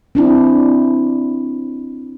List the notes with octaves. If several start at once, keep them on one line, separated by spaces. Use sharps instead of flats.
C4 D4 E4